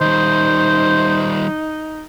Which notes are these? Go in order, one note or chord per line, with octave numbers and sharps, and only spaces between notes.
D#3 G3 D#4 C5